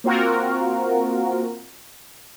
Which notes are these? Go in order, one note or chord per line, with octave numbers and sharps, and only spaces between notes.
A#3 C4 F4 F#4 A#4